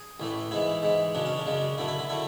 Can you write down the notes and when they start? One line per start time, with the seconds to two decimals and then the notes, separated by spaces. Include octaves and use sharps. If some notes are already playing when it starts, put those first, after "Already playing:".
Already playing: G#4
0.20 A1 A2 E3 A3
0.51 G#2 E3 G#3 E4
0.83 G#2 E3 G#3
1.15 F#2 C#3 G#3 D4
1.26 C#4
1.37 D4
1.46 F#2 C#3 G#3
1.78 F#2 D3 A3 E4
1.88 E4
1.99 E4
2.10 D3 A3 E4